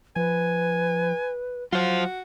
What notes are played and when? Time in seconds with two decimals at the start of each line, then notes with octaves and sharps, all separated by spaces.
0.16 F3 B4 G#5
1.73 F#3 F4 F#4 C5